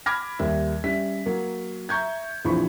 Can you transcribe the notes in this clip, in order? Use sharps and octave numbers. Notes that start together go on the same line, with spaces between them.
B5 D6 F6 G#6 A#6
D#2 G3 E5
G3 C#4 E5 B6
F#3 A#3
E5 A#5 C#6 G6 G#6
A#1 E3 F3 C4 B5 C#6